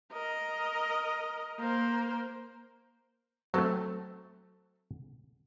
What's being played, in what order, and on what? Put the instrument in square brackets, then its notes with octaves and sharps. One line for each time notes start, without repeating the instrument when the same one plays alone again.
[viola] A#4 D#5
A#3 C5
[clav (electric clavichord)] F#3 A3 [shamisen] C4 A4 C5